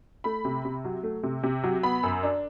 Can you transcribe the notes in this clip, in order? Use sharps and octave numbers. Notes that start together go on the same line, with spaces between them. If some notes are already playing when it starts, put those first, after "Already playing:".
A3 B5
C3
C3
F#3
A3
C3
C3
F#3
B3 B5
F#2
D4